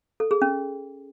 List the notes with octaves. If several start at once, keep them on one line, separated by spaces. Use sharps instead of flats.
A4
G#4
C#4